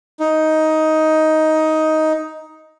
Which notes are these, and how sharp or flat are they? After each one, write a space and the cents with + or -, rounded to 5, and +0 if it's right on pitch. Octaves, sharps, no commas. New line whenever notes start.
D#4 +10